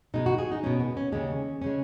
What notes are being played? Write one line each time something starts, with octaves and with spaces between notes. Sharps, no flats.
B2 G#3 D#4
F#4
G#4
D#4
B2 G#3 C#4
B3
C#4
D#2 C#3 G#3 C#4
C#3 G#3 C#4